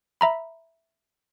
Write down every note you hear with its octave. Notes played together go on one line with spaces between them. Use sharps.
E5 A#5 B5